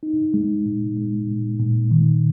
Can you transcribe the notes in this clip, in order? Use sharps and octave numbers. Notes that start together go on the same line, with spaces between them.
D#4
G#3
A#2
G#3
A#2
A#2
D#3